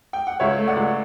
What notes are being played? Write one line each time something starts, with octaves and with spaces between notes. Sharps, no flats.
G5
F#5
C#2 C#5 E5
A3
D5 F#5
C#2